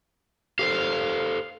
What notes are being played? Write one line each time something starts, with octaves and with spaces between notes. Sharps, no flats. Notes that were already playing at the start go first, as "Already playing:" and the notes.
G4 A4 C5 F5